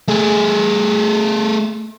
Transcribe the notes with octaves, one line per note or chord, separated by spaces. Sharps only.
A3 G#4